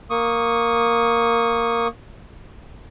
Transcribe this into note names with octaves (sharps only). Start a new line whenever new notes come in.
A#3 C#6 D#6